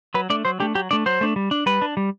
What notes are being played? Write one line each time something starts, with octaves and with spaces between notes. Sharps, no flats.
F#3 B4
A3 D4 D5
F#3 C5
A3 D4 G4
F#3 G4
A3 D4 D5
F#3 C5
A3 D4
G3
D4
G3 B4
D4
G3